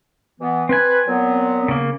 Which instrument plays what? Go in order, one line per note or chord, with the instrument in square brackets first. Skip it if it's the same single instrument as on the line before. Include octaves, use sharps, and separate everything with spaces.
[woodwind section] B2 E3 B3
[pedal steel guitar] C4 G#5 [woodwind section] B4
[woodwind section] A#2 F#3 B3
[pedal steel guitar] C#3 A#3